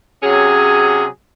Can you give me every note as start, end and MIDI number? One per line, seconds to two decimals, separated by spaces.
0.23 1.05 48
0.23 1.05 54
0.23 1.05 61
0.23 1.05 68